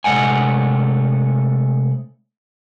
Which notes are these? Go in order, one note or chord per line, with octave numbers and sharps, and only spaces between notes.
C3 G#3 A3 F#5 G#5